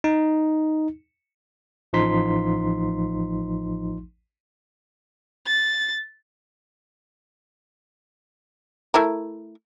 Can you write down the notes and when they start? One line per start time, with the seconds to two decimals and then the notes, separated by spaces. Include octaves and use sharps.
0.04 D#4
1.93 A1 F3 D#4 C6 B6
5.47 A6
8.94 A3 E4 A#4